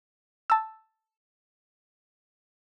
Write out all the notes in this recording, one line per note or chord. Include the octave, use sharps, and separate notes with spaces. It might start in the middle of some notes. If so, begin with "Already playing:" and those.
A5 E6